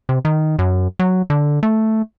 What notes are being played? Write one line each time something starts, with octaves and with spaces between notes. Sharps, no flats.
C3
D#3
F#2
F#3
D3
A3